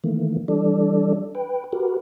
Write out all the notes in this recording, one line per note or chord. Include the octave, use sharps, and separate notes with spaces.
D#3 E3 A3 A#3
E3 G3 D4 A4 D5
B4 G5
F#4 G4 A#4 B4